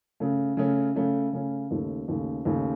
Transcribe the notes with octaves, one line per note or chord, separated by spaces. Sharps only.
C#3 A3 C#4
C#3 A3 C#4
C#3 A3 C#4
C#3 A3 C#4
D#2 C#3 A3
D#2 C#3 A3
D#2 C#3 A3